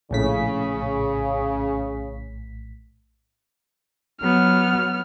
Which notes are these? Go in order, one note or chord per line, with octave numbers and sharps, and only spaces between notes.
A#1 A2 C#3 B6
F#3 B3 F6